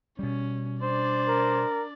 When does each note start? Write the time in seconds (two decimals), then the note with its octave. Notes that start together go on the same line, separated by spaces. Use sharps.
0.19 B2 G3 C#4
0.82 D4 C5 D5
1.28 A#4